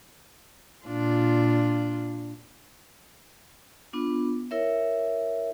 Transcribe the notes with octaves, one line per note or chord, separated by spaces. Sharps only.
A#2 D4 F4
B3 D4 F4
E4 A#4 C#5 E5